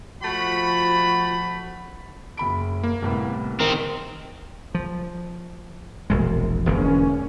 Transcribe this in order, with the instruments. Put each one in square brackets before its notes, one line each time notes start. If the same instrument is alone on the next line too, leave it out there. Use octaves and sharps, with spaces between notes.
[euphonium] F3 [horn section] A3 F#4 B5
[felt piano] F#1 B5 D7
[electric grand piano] A#3
[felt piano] C2 A2 B3
[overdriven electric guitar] D#3 C4 [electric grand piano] A#4
[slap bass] F3
E1 A#1 G#3
[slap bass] E1 E2 D3 [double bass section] G#2 A#3 C#4